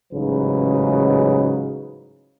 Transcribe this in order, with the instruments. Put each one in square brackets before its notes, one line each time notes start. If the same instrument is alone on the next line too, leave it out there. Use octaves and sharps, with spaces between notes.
[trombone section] A1 G#2 C#3 F#3 D#4 B4